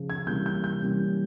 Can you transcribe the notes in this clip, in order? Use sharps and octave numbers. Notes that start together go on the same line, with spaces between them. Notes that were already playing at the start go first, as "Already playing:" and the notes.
Already playing: C#3 F3
G#6
C3 E3 G3 A#3 C#4 G6
G6
G6
C3 E3 G3 A#3 C#4